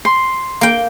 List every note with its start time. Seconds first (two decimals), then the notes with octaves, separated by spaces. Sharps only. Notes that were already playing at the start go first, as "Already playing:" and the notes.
0.05 C6
0.61 A#3 G5